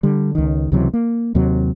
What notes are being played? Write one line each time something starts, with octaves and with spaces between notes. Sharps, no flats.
D3 G3
C#2 D#3
C#2 C3 E3 F#3
A#3
D#2 C3 F#3